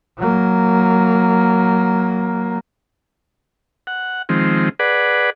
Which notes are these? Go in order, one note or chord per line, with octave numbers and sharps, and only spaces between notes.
F#3 A#3
F#5
D#3 F3 G#3 C4
G#4 B4 D5 F#5